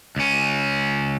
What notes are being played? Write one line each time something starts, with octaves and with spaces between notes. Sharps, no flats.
C#2 C#4